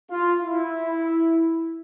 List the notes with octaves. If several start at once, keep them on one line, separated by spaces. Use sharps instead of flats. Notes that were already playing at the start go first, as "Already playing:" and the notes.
F4
E4